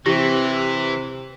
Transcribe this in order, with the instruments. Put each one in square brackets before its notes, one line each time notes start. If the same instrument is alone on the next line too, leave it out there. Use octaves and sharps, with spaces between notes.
[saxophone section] C3 [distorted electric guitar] E3 [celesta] E4 G4 A#6